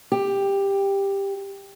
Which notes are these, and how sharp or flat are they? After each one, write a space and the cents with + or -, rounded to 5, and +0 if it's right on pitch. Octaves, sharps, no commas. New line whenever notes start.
G4 +10